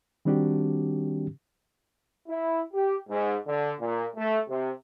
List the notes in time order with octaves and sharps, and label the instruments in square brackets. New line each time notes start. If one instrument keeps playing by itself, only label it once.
[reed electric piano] D#3 G3 C4 D4 F#4 G4
[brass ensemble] E4
G4
G#2
D3
A#2
A3
C3